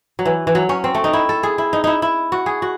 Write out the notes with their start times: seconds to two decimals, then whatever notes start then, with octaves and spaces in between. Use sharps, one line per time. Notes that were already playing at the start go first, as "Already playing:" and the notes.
0.19 F#3
0.25 E3
0.47 E3
0.55 F#3
0.69 C#4
0.84 C4
0.95 A3
1.04 D#4
1.13 E4
1.29 A4
1.43 G#4
1.58 E4
1.73 D#4
1.84 D#4 E4
2.02 E4
2.32 F#4
2.46 G#4
2.62 F#4